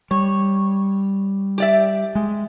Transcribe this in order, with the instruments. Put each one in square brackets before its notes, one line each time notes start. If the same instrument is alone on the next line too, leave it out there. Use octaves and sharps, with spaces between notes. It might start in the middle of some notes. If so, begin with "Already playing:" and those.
[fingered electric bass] G3 [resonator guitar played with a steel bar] C#5
[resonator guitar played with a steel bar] G4 D5 E5
[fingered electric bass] G#3